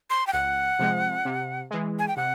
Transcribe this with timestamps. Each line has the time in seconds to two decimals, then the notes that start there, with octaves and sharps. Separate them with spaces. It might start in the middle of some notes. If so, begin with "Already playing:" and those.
0.10 C6
0.27 G5
0.33 C#2 F#5
0.79 C3 F3 G#3
1.25 C3
1.71 E3 G#3
1.99 G#5
2.08 G5
2.17 C3 F#5